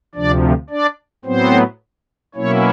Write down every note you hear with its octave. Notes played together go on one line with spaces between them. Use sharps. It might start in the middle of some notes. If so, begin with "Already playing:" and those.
D2 C3 F3 D4 D5
D4 D5
A2 F#3 B3 C4 C5
B2 F#3 A#3 C#4 E4 C#5